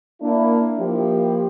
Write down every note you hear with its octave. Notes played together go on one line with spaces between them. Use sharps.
A#3 D4 E4
F3 A#3 E4 G4